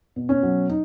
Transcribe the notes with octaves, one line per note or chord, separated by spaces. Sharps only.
B2
C#4
F#3
D#4